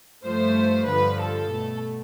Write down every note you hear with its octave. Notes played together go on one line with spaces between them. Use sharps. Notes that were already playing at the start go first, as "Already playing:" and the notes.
G2 F3 A3 C5
G2 D3 F3 B4
A4
B2 A3